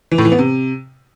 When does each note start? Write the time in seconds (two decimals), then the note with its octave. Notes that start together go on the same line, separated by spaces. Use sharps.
0.11 E3
0.18 A2
0.25 E3
0.32 B3
0.38 C3